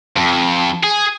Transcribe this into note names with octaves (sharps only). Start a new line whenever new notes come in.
F2
G#4